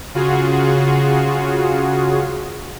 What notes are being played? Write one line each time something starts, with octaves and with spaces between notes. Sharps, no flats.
C#3 F4 F#4 G#4